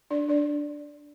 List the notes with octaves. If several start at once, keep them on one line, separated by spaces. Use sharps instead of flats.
D4 D5
D4 D5